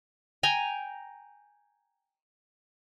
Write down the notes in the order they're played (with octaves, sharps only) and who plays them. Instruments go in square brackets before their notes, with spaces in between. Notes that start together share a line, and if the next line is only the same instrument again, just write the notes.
[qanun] G5 G#5 A#5